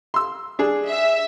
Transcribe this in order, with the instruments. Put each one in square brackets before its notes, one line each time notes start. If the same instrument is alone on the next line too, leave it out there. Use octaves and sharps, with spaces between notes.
[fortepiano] C6 E6
D4 G#4
[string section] E5